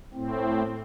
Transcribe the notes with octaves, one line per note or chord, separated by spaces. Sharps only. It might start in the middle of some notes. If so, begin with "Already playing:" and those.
A2 C4